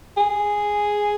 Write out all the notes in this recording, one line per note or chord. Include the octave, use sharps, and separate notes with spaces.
G#4